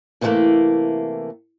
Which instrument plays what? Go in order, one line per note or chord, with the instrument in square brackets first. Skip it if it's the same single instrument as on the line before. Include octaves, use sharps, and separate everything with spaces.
[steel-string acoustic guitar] C3 E3 F#3 G3 A3 A#3